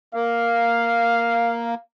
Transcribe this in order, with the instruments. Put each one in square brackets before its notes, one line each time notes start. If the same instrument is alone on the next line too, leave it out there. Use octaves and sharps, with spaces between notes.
[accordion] A#3 [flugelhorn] F5